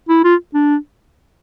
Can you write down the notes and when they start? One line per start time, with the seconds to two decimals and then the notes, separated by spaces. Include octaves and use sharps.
0.09 E4
0.24 F4
0.54 D4